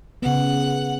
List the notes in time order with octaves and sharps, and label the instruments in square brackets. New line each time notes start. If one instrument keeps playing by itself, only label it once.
[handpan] C#3 B3 [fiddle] F#5